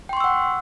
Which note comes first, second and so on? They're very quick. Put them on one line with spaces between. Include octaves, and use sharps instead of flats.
G5 C6 C#6 E6 F#5